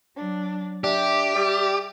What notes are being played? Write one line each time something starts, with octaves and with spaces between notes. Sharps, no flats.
F#3 D4
D4 G4 E5
G3